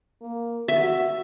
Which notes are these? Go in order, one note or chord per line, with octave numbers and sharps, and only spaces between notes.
A#3
F#4 E5